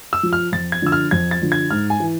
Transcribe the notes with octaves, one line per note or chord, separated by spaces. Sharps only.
E6
F3
F6
F2 A6
G#6
D3 F3 E6
F6
F2 G#6
A6
D3 F3
G#6
G#2 F6
G#5
E3